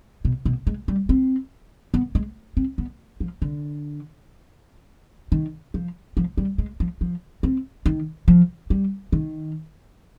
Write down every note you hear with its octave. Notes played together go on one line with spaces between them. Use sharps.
B2
B2
G#3
G3
C4
B3
G#3
C4
B3
F3
D3
D#3
F3
F3
G3
G#3
F3
F3
C4
D#3
F3
G3
D#3